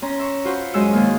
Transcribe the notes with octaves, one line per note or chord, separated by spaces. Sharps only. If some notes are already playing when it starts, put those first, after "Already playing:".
C#4 A#5 C6
E5 C#6
F4 F#4 C5 F#5 B5 C#6
F#2 G#3 D#5 D#6 E6
G#2 D#3 A#3 F5